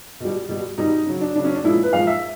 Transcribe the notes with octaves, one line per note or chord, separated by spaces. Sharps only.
B2 G3
B2 G3
B2 G3 D#4
C#3 F#3
D4
C#3 F#3 D4
C#4
D4
A#2 F3 G#3 E4
B4
A#2 F3 G#3 F5
E5